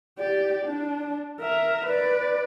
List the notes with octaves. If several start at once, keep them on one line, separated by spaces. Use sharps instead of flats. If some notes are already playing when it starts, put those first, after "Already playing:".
G4 D5
D4
A#4 E5
B4 D5